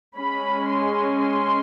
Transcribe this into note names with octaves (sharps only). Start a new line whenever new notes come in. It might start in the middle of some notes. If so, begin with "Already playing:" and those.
G#3 C#4 B5
C6
C6